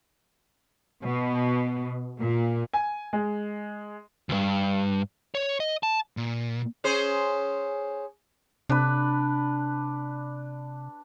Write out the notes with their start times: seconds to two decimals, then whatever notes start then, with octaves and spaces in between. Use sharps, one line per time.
1.05 B2
2.20 A#2
2.73 G#5
3.13 G#3
4.29 D2 G2
5.35 C#5
5.60 D#5
5.83 A5
6.17 A#2
6.84 C#4 G#4 C5
8.69 C3 D4 B4